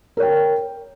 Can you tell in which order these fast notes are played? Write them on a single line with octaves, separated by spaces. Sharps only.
A#4 C#5 G5